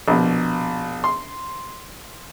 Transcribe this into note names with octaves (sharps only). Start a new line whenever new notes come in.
A#1 B2
C6